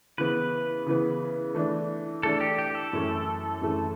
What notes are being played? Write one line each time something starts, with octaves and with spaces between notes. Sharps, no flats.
C#3 E3 B3 B4
C#3 E3 B3
E3 A3 D4
E3 A3 D4 A4
G4
G4
A4
F#2 E3 A3 C#4
F#2 E3 A3 C#4